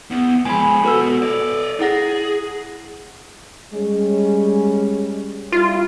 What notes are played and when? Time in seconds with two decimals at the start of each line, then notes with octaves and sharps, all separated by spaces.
0.11 E2 B3
0.45 F3 G#3 G#5 B5
0.84 B3 F#4 A4 B4 E6
1.22 C#5 D5
1.80 E4 G#4 F#5 A#6
3.73 G3 G#3 C#4
5.52 G3 E4 F4